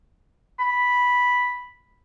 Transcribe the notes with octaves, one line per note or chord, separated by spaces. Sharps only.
B5